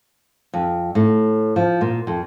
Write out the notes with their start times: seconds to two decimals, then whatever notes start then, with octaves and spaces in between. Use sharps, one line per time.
0.54 F2
0.95 A2
1.56 F3
1.81 A#2
2.07 F2